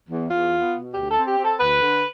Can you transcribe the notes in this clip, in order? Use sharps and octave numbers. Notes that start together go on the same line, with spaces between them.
E2
E2 F4
B3
B2
D2 G4
A4
C4
G4
C4
A4
D2 B4
D3